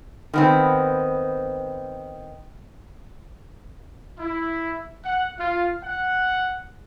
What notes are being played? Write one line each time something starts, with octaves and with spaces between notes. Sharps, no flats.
D#3 B3 C4
E4
F#5
F4
F#5